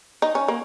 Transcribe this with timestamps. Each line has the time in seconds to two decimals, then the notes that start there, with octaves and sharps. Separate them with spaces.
0.22 D#4
0.35 C#4
0.48 A#3